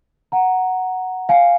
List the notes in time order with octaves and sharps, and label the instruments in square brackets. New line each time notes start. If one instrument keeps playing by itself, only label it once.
[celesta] F#5 A#5
F5 G#5